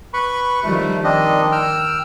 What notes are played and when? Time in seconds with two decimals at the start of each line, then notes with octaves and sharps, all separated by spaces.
0.13 B4 B5 C#6
0.63 D#3 F3 G3 A3
1.04 D#3 C4 D4 D#5
1.52 G5 E6 F6